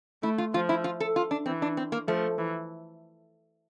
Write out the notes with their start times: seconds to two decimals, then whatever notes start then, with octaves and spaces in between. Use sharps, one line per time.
0.23 A3 E4
0.38 F4
0.54 F3 F4
0.69 E4
0.84 F4
1.00 A4
1.16 F4
1.31 D4
1.46 E3 C4
1.62 D4
1.77 C4
1.92 A#3
2.08 F3 A3
2.38 E3